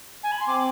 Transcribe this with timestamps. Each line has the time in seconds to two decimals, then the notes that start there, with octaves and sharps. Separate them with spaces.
0.23 G#5
0.31 B5
0.39 C6
0.47 C4 D6